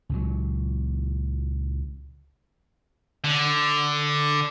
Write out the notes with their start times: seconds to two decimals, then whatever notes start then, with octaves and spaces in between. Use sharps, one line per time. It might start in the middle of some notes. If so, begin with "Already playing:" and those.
0.09 C#2 A#2 F#3
3.24 D3